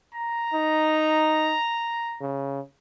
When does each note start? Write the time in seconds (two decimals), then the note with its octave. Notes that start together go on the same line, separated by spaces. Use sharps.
0.14 A#5
0.54 D#4
2.21 C#3